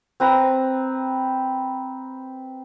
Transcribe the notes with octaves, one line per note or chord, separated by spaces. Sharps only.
C4 B4 A#5